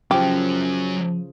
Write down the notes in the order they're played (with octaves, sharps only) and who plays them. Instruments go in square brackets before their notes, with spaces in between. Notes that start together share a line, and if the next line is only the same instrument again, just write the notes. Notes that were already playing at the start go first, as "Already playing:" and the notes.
[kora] C#3 F3 [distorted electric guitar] F#3 C#4 [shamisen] G4